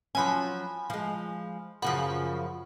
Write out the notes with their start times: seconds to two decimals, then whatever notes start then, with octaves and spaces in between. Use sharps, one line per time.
0.15 F3 F#3 C#4 G#5 B5
0.90 F3 G#3
1.82 F#2 C#3 F3 F#5 B5